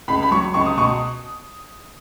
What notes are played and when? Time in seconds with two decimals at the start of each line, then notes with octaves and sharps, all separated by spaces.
0.08 C#2 B5
0.22 B5
0.31 F#3 C#6
0.54 C#2 C#6
0.66 D#6
0.77 B2 C#6